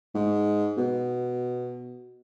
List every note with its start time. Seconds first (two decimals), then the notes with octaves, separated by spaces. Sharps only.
0.15 G#2
0.78 B2